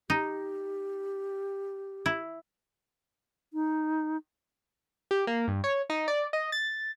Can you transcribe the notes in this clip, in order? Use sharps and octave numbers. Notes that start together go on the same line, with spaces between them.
D#4 G4
E4
D#4
G4
A#3
G2
C#5
D#4
D5
D#5
A6